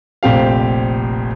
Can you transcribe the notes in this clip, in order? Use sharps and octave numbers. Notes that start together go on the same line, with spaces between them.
F1 A#1 C4 G4 F5